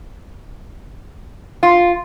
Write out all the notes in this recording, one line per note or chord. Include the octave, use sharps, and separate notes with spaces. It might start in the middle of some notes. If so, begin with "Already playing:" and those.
F4